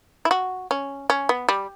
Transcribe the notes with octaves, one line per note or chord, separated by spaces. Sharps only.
E4
F#4
C#4
C#4
B3
G3